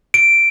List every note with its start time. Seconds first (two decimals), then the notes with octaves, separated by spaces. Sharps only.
0.14 D7